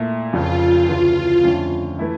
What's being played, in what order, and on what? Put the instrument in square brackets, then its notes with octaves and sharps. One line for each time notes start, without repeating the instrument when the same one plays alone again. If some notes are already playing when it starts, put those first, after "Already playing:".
Already playing: [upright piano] A#2 A3 E4
[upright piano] F1 F2 C#3 [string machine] F4
[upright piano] D2 C#3 E3
F2 D3 A3 C#4
E3 A3 E4